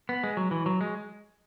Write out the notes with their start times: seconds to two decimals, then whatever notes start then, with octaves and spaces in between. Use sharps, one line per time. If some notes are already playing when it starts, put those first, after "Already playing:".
0.09 B3
0.24 G#3
0.37 F#3
0.51 E3
0.66 F#3
0.81 G#3